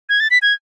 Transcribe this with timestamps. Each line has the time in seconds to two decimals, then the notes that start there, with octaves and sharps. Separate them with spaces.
0.09 G#6
0.20 A6
0.31 B6
0.42 G#6